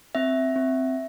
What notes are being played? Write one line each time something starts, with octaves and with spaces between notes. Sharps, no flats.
C4 E5
C4